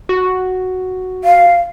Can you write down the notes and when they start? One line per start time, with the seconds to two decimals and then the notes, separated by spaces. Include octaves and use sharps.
0.09 F#4
1.24 F5